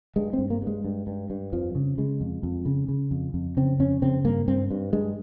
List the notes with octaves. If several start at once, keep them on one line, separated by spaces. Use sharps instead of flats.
G2 G#3
C4
G2
A#3
G2 G#3
G2
G2
G2
F2 F3
C#3
C#3 G#3
F2
F2
C#3
C#3
F2
F2
C#3 C4
F2 C#4
C#3 C4
G2 A#3
G2 C4
G2
G2 G#3